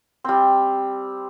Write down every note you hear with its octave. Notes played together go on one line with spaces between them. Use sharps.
G3 C4